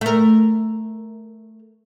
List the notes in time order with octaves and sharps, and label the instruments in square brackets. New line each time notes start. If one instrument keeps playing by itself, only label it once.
[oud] A3 A#4